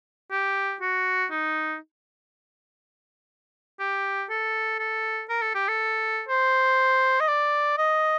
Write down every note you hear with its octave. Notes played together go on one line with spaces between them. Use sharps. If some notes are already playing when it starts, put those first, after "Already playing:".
G4
F#4
D#4
G4
A4
A4
A#4
A4
G4
A4
C5
D#5
D5
D#5